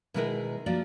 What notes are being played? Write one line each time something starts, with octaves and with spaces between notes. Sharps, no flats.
B2 D#3 G#3 E4 A#4 B4
F3 A#3 D4 F#4 D5